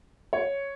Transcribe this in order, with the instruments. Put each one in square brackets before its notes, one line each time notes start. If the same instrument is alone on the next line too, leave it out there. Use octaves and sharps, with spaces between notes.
[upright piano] C#5